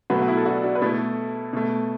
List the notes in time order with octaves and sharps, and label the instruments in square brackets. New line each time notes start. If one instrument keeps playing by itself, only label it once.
[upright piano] B2 F#3 A3 F#4 B4
F#4
E4
A4
D4 F#4
D4 F#4
B4
B2 A3 E4 A4
B2 A3